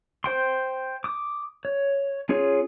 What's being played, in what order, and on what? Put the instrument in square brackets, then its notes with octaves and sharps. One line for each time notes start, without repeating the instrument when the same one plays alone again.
[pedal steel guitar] C5 G5 C6
D6 D#6
C#5
C#4 F4 G#4 C#5